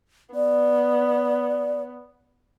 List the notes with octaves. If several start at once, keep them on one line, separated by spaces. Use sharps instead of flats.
B3 D5